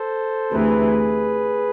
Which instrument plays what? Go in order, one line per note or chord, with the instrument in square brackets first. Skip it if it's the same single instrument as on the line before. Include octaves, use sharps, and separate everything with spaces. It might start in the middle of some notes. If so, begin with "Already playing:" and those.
Already playing: [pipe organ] A4 C5
[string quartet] D2 C3 E3 [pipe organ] G#4 B4